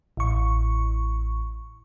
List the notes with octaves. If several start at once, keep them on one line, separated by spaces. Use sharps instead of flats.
A1 C#6